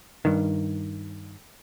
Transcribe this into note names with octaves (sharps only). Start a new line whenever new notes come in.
G2 D#3